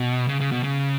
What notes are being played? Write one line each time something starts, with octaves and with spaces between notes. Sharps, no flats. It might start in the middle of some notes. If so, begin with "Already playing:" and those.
Already playing: B2
C#3
C#3
B2
C#3